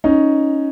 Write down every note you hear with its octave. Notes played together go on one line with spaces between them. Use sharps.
C#4 D#4